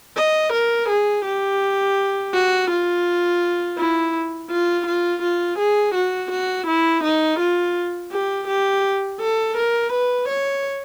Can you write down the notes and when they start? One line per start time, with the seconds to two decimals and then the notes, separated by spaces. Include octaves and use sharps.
0.17 D#5
0.53 A#4
0.89 G#4
1.25 G4
2.33 F#4
2.70 F4
3.78 E4
4.51 F4
4.87 F4
5.22 F4
5.59 G#4
5.95 F#4
6.31 F#4
6.67 E4
7.04 D#4
7.40 F4
8.12 G4
8.48 G4
9.21 A4
9.57 A#4
9.93 B4
10.29 C#5